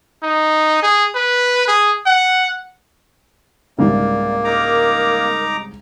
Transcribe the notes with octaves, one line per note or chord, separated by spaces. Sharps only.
D#4
G#4
B4
G#4
F#5
C2 G#2 C#3 A#3 D5
D#4 A#4 A#5 D6